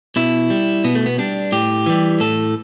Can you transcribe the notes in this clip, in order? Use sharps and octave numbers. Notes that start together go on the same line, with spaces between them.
B2 E4
G3
B2 B3
A3
B3
G3 D4
A2 G4
E3 G3
A2 A4